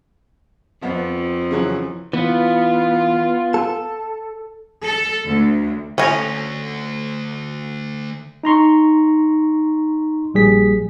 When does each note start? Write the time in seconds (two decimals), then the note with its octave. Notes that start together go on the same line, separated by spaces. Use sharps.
0.82 F2 F3 B3
1.51 C#3 E3 F#3
2.13 E3 B3 F4
3.54 A4
4.84 A4
5.27 D2
5.98 D2 C#4 A4 G#5 A#6 F7
8.43 D#4 A#5 C6 C#6
10.34 A#1 G3 G#4 B6